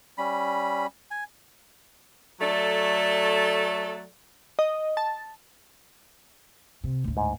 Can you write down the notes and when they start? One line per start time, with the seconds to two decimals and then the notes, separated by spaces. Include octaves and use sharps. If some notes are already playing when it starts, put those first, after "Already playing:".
0.18 G3 C#4 B5
1.11 G#5
2.40 F#3 A3 A4 D5
4.59 D#5
4.97 A5
6.84 C3
7.04 D2 A2
7.17 G#2